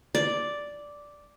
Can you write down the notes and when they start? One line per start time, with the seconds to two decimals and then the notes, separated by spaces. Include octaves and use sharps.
0.15 D5